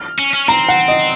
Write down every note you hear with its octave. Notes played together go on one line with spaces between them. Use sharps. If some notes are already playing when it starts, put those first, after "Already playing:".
Already playing: F6
C#4
C#4
C4 A#5
F#5
D#5